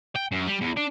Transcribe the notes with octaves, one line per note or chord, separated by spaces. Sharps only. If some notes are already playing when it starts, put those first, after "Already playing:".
G5
F#2
G3
E2
D4